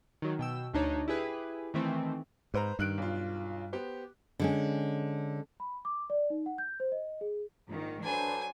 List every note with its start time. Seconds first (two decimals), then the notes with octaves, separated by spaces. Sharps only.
0.22 D#3 F#3
0.39 B2 G5 E6
0.74 D2 D4 D#4 C#5
1.08 E4 G4 G#4 B4
1.74 D#3 E3 A3 C4
2.54 G#2 B4 C5 A#5
2.79 G2 D#3 F#6 D7
2.98 B1 F4
3.73 B3 G4 C5
4.40 D3 G#3 C#4
5.60 B5
5.85 D6
6.10 D5
6.30 D#4
6.46 F#5
6.58 G6
6.80 C5
6.92 D#5
7.21 G#4
7.68 A#1 G#2 D#3
8.04 F#3 D4 A4 B4 C5 G#5